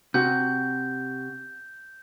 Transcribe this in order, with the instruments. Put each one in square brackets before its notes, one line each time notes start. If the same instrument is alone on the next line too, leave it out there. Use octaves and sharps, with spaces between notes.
[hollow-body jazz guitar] C3 [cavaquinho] F#4 [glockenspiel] G6